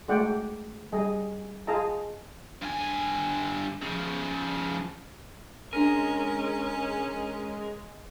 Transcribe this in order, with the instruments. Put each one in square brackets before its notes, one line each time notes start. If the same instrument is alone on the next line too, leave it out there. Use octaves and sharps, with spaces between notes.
[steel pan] G#3 A3 F#4 D5 F#5 G5
G3 G#4 D#5
F4 G#4 D#5 A5 A#5
[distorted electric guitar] G2 G#5
C#3 F3
[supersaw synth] G#3 [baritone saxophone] C#4 [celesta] D4 D#7 [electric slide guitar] A#4